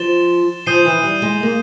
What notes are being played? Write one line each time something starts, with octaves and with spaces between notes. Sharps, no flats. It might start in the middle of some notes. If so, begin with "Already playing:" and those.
Already playing: F3 A6 E7 G7
F3 D#6 G6 C7 D#7 G7
E3
G3
G#3
A#3